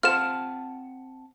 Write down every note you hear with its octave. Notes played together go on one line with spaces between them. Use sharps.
C4 F4 C5 F#5 A5 F6 E7